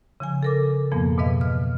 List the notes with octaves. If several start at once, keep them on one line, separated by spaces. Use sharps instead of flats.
C#3 F3 G#5
A4 A#4 D6
F2 G#2 B2 F3 A#3 B3
G#2 B2 E3 B4 D#5 F5
F6